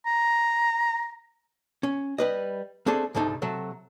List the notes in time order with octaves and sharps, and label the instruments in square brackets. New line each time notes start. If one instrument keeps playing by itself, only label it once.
[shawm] A#5
[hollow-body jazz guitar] C#4
G3 B4 D#5
A3 C4 D4 G#4 A4
C2 G#2 D3 A3 D#4
C3 F#3 A3